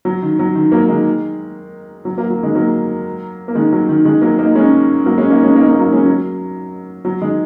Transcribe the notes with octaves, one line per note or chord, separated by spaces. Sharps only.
F#3
D#3
F#3
D#3
F#3 A#3
D#3 G#3
F#3
F#3 A#3
F#3
D#3 G#3
F#3 A#3
A#3
D#3 G#3
F#3
D#3
D#3 G#3
F#3 A#3
A#3 D#4
G#3 C#4
F#3 A#3
G#3 C#4
A#3 D#4
G#3 C#4
A#3 D#4
A#3 D#4
F#3 A#3
G#3 C#4
F#3
F#3
D#3 G#3